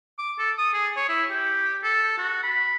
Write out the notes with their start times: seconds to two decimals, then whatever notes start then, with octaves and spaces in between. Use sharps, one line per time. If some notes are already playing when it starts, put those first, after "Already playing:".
0.19 D6
0.39 A4
0.58 D#6
0.74 G#4
0.97 C#5
1.09 E4
1.30 G4
1.84 A4
2.18 F#4
2.43 B5